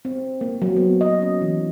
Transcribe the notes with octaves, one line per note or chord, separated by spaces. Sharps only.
C4
A#3
F#3
B3
D#5
C#4
E3